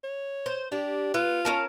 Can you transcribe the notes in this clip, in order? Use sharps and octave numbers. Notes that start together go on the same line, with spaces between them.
C#5
C5
D4 G4
B3 F4
C#4 A#4 A5